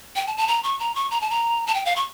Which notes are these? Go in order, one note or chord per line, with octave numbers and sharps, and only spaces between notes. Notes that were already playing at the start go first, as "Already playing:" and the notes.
G5
A5
A5
A#5
C#6
A#5
C#6
A#5
A5
A#5
A5
G5
F5
C#6